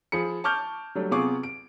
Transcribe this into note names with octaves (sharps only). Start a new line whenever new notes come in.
F3 G#4 B5 C#7
A5 C#6 D6 F6 G6
F#3 G3 A3 D4
C3 B3 F4 G#4 C#6 D6
D7